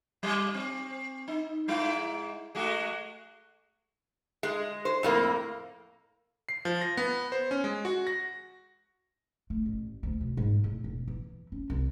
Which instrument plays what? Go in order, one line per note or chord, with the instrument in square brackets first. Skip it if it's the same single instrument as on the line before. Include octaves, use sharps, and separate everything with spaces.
[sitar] G3 G4 D5
C4
D#4
G#2 G#3 E4
G#3 A3 F#4
[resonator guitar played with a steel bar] G#3
C5
F2 A2 A#3
[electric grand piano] C7
F3
A#6
B3
C5
C#4
G#3
F#4
A#6
[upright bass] A3
A1
D2
B2
G#2
A2
E1
E3
C#4
C2